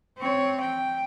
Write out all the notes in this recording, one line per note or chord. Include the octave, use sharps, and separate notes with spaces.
C4 C#5
G5